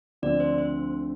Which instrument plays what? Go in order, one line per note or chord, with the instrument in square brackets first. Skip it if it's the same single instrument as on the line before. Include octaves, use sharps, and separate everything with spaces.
[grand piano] D2 D3 F3 C4 F4 [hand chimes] D5
[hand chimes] C5
C5